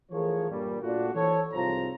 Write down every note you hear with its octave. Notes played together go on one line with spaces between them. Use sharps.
E3 F3 A3 G#4 A#4 C#5
G2 A#2 G3
A#2 A3 D4 F4 F#4
E3 A4 C5 C#5
C2 G#2 F3 F4 C5 A#5